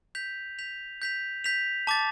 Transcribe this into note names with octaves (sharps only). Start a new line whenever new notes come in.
G6 B6 F7
G6 B6 F7
G6 B6 F7
G6 B6 F7
A5 D6 A6